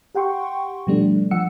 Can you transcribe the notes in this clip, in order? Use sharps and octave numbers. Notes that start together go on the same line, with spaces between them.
G4 F#5 G5 C6 C#6
B2 F3 G3 A3 D4
F3 F#5 E6 C#7